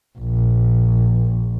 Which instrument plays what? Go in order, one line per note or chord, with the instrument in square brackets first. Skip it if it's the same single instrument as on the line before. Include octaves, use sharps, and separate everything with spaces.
[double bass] A#1